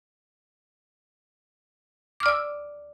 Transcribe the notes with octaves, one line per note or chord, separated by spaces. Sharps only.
D5 D6 E6 F6